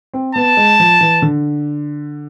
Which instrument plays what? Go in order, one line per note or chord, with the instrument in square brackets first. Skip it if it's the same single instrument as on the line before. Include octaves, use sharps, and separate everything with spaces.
[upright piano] C4
[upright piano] B3 [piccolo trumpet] A5
[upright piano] G#3
F3
E3
D3